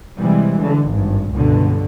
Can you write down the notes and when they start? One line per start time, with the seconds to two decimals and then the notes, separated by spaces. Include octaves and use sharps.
0.18 C3 E3 G3 G#3
0.60 D3
0.89 G#1 G2
1.33 C#2 G2 B2 D3